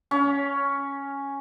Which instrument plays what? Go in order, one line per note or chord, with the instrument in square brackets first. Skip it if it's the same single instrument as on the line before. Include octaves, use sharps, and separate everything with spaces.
[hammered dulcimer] C#4